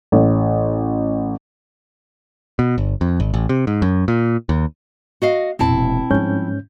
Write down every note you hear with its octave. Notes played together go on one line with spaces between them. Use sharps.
A1
B2
G1
F2
G#1
A1
C3
G#2
F#2
A#2
D#2
F#4 D#5 F5
E1 A#2 C4 E4 A5
G#2 F3 G3 C#4 G6